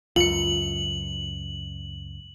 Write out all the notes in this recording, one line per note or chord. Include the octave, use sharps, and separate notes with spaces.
C#2 F#2 F4 C#7 F#7